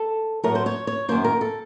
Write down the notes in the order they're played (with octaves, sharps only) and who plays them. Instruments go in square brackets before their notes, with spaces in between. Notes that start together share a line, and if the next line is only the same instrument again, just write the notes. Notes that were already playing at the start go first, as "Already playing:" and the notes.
Already playing: [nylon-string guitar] A4
A2 F#3 A3 A#4
C5
C#5
C#5
F#2 D#3 A#3 C5
A#4
A4